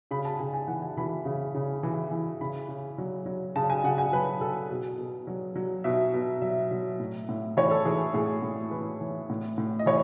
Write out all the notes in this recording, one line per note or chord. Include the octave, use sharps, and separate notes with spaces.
C#3 B5
A5
C#3 G#5
G#5
E3 F#5
G#5
E3 B5
C#3
C#3
E3
E3
C#3 B5
C#3
F#3
F#3
C#3 A5
G#5
C#3 F#5
G#5
F#3 B4
F#3 A4
B2 G#4
B2
F#3
F#3
B2 E5
B2
F#3 E5
F#3
A2
A2
E3 C#5
A4
E3 G#4
A2 G#4
A2
E3 B4
E3
A2
A2
D#5
E3 C#5